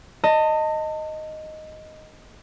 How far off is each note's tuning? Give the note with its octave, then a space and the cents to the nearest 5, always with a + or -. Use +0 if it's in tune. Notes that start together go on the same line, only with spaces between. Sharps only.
D#5 +0 A5 +35